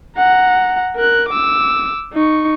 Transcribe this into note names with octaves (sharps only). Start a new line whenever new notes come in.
F#5 A#5
A#4 F#6
D6 E6
D#4 C#6